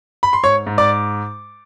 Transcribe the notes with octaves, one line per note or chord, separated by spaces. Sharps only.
B5
C6
G#2 C#5 C#6
G#2
D5 D6